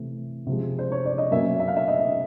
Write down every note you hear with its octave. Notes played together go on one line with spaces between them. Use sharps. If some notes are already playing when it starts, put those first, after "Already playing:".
Already playing: C3 E3 A3
C3 F3 G#3
C5
C#5
D5
D#5
B2 F#3 A#3 C#4 E5
E5
F5
E5
D#5